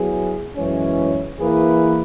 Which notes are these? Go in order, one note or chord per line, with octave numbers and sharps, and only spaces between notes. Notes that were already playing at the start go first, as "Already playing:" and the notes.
Already playing: F#3 B3 E4 G#4
F#2 E3 G#3 C#4
E3 A#3 E4 G#4 B4